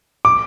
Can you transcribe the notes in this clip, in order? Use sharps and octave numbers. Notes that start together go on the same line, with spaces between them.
D6